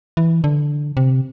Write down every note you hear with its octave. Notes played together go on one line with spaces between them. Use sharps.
E3
D3
C3